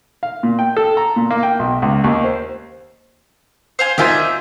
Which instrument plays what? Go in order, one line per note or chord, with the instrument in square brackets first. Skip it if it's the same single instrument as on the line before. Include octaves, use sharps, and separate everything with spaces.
[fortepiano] F5
A#2
G5
A4
A#5
A#2
A#3
G5
B1
C#2
D#2
C5
[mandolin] C5 F5 G#5
[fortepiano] D#3 F4 C5 [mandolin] D5 E5 G#5